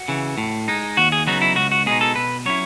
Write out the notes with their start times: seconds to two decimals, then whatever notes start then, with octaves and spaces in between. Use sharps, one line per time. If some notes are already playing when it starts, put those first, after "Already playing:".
Already playing: F#4
0.08 C#3 E3
0.38 A2
0.68 G#3 D#4
0.97 D#2 F#4
1.12 G#4
1.27 C#3 F#3 B3 D#4 F#4
1.42 E4
1.56 C#2 F#4
1.72 F#4
1.86 B2 G#3 D#4 G#4
2.01 A4
2.16 B2 B4
2.45 F#3 C#4 E4 C#5